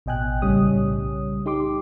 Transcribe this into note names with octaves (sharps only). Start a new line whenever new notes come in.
A1 B2 D#5 G5 G#5 F#6
B1 A2 C#3 G3 C#5 D#6
D#4 G4 C6 D6